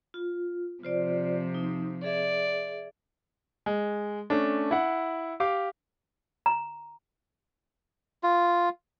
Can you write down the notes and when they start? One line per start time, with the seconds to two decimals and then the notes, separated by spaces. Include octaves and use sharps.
0.14 F4
0.83 C3 F3 F4 C5 D5
1.54 D#4
2.04 G#4 D5 E5
3.66 G#3
4.30 A3 C#4 D4
4.71 E4 F#5
5.40 G4 F5 D6
6.46 A#5
8.23 F4